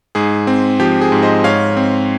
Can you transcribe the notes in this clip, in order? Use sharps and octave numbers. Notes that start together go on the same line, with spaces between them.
G#2 G#4
C4
F3 G4
G#4
G#2
C5 D#5
G#2 C#5 F5
C4